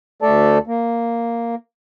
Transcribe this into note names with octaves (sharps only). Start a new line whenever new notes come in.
D2 A3 A4 D5 A5
A#3